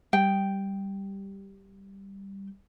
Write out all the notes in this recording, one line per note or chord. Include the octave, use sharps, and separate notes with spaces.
G3 G5